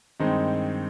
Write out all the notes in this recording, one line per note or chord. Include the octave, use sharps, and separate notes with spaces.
G2 D#3 G#3 C4 D#4